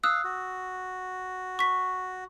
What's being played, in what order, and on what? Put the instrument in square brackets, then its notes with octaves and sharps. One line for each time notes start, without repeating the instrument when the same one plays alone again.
[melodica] F5 [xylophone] D#6 E6 F#6
[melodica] F#4
[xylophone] C#6 B6